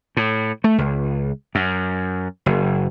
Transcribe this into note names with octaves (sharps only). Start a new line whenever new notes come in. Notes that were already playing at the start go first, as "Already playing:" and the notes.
A2
A3
C#2
F#2
F#1